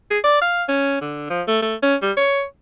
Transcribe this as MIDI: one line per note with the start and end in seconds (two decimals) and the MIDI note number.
0.11 0.19 68
0.24 0.41 74
0.41 0.63 77
0.68 1.00 61
1.01 1.26 50
1.30 1.42 53
1.48 1.60 57
1.62 1.75 57
1.83 1.95 61
2.02 2.12 55
2.17 2.43 73